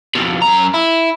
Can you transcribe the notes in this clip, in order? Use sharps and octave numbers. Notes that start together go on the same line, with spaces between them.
F2 B2
F#2 A#5
E4